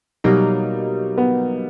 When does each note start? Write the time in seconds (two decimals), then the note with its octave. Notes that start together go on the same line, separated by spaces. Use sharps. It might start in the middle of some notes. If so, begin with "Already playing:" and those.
0.24 B2 F#3 G3 A#3 D#4
1.18 B3